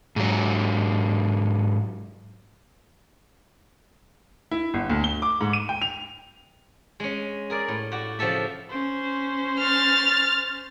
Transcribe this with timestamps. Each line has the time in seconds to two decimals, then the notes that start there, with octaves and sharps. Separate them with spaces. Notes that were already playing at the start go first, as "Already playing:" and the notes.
0.16 G#2 F#3
4.51 E4
4.74 G1
4.90 D2
5.04 G7
5.22 D6
5.41 G#2
5.53 D#7
5.69 G5
5.82 F7
7.00 G#3 C#4
7.50 G#4 A#4 D5
7.68 A2
7.92 F#4 G4 D5
8.19 C#3 F3 G4 A4 E5
8.69 C#4 C5
9.59 F6 A6